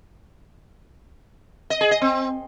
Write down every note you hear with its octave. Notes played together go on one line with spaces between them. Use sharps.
D#5
G#4
D#5
C4